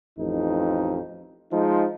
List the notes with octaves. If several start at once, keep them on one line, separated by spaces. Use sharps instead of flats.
A1 F2 D#4
F3 G#3 D#4